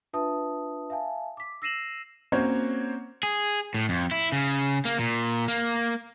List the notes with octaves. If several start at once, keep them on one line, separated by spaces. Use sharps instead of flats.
D4 F4 B4 E5 A5 D#6
E5 F5 G#5 A5
D6 B6
E6 A#6 C7 D#7 E7 F#7
A#3 C4 C#4 F#4 C5 C#5
G#4
A2
F2
E4
C#3
A#3
A#2
A#3